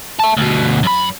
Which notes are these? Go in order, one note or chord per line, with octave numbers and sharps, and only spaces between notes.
E5 A5
D2 B2
F#2 B5